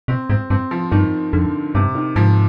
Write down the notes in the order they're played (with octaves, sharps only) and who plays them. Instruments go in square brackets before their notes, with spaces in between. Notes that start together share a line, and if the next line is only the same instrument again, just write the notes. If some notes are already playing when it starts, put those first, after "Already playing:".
[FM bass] B2 [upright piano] C4
[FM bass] G#2 [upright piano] C4
[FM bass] G2 [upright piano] C4
[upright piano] F3
[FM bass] G2 [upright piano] D#3
[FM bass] F2 [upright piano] D3
[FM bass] G2 [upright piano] C3
[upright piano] D#3
[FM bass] G#2 [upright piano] F3